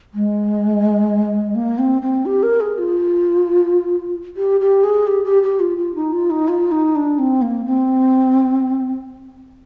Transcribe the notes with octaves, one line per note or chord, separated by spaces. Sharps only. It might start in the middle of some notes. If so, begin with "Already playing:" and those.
G#3
A#3
C4
C4
G4
A#4
G#4
F4
G4
G4
G#4
G4
G4
G4
F4
F4
D#4
F4
D#4
F4
D#4
D4
C4
A#3
C4